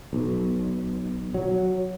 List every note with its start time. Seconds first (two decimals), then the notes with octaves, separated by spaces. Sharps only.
0.13 B1
1.34 F#3